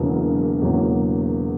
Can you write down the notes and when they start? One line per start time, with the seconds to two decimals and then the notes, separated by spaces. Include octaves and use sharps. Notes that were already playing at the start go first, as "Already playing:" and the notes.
Already playing: E1 E2 C#3 F#3 A#3
0.62 E1 E2 C#3 F#3 A#3